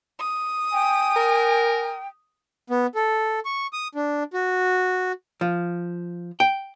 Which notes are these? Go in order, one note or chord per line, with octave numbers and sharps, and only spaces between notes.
D#6
G5 G#5
A#4
B3
A4
C#6
D#6
D4
F#4
F3
G5